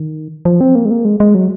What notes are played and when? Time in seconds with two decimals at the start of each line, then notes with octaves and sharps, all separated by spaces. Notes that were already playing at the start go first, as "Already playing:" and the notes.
Already playing: D#3
0.45 F3
0.61 C4
0.75 A#3
0.85 G#3
0.91 A#3
1.05 G#3
1.20 G#3
1.35 F#3